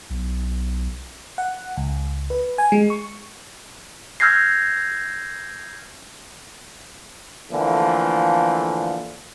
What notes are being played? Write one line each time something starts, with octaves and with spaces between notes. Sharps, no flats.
B1
F#5
C#2
B4
G#5
G#3
C#6
E6 F6 G6 G#6 A#6 C7
D3 E3 F3 A3 A#3